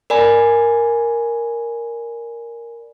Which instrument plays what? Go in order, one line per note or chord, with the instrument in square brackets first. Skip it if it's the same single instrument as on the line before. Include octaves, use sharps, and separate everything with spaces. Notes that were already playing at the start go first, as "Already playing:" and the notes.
[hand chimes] A#4 D5 G#5 B5